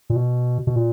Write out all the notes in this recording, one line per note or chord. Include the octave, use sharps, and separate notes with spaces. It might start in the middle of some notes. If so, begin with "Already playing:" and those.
A#2
B2
B2
A#2